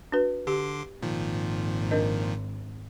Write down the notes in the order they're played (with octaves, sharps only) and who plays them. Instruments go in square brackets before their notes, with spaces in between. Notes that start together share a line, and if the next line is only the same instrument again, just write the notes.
[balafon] D4 F#4 B4
[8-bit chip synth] D3 C6 D6 [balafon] G4
[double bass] G#1 [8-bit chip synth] A#2 D#3 F3
[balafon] D4 A#4 D#5